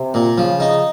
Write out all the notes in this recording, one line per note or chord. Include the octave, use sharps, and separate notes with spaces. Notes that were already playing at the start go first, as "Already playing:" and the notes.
Already playing: C3
A#2
C#3 F3
D#4